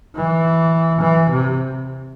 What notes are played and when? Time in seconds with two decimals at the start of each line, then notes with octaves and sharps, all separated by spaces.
0.16 E3
1.01 E3
1.30 C3